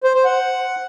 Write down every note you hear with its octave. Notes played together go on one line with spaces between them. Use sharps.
C5
C5
F#5